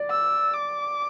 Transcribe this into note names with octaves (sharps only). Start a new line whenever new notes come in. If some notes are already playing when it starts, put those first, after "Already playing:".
Already playing: D5
E6
D6